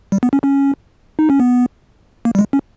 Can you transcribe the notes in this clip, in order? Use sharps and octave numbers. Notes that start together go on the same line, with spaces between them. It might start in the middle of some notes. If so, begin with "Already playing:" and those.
G3
B3
C#4
C#4
D#4
C#4
B3
A#3
G3
G#3
C#4